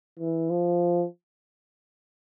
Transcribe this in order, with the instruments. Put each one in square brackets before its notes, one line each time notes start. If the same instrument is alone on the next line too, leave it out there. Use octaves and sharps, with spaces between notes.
[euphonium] E3
F3